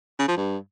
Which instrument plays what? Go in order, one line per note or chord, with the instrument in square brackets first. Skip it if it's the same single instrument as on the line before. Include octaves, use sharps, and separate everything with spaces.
[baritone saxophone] C#3
F3
G2